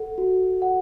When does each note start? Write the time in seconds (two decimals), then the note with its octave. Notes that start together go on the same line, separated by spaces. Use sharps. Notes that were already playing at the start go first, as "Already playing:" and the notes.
Already playing: A4 F#5
0.18 F#4
0.62 F#5